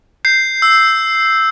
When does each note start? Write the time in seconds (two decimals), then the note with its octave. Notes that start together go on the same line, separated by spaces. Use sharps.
0.25 G6 C7
0.62 E6